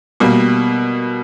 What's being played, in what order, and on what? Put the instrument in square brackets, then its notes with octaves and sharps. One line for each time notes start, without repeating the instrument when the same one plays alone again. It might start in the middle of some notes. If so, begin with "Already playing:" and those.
[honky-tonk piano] B2 G3 A#3